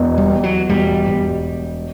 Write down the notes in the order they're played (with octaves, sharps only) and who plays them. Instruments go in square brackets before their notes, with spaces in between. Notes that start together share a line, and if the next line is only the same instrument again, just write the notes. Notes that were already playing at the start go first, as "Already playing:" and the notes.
Already playing: [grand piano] E1 E2
[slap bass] G3
[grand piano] E2
[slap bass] F#3
[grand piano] E1 [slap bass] G3
[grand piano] E1